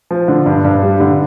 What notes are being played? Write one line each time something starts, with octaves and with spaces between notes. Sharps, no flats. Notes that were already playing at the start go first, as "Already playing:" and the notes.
F3
D3
G2
G2
G3
D3